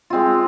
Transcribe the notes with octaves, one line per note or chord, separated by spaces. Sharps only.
G#3 C4 F4